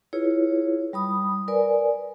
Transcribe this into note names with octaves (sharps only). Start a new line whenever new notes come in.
E4 F4 G#4 B4 C#5
G3 B5 D#6
A#4 B4 D5 G#5